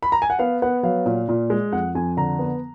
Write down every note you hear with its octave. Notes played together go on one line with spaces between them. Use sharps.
B5
A#5
G#5
F#5
B3 F5
B3 F#5
F#3 F5
A#2
A#2
G#3
F2 F#5
F2 G#5
D3 A#5
B3